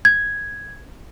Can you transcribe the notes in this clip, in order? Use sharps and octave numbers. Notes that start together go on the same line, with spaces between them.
G#6